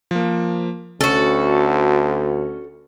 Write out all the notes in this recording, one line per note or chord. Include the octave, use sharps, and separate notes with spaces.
F3 A#3
D2 C#4 F#4 A4